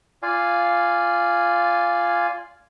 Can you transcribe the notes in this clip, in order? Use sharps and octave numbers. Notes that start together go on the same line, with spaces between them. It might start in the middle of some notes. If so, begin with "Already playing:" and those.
F4 D5 F5 G#5